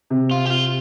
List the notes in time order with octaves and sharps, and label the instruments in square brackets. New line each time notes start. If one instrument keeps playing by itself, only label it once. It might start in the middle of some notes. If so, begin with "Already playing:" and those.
[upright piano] C3
[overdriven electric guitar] F4
G4
F4